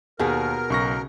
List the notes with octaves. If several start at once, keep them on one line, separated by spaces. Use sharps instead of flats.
D#2 B2 G#4 A#4
B1 C#3 C#6 A#6